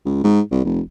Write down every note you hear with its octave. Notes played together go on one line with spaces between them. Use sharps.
C#2
G#2
C2
F1